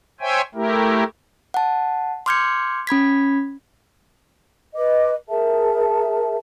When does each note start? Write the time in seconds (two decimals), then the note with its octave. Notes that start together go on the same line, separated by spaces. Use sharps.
0.21 C5 C#5 E5 G5 G#5
0.55 A3 E4 G4 A#4
1.54 F#5 A5
2.26 C6 D6 F6 G6 G#6 C#7
2.87 C#4 B5 G#6 B6
4.75 B4 D#5 D6
5.28 G#4 A#4 E5 A5